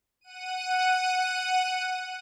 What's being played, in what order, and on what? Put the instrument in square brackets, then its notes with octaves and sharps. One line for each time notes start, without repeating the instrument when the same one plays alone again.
[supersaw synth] F#5 D#7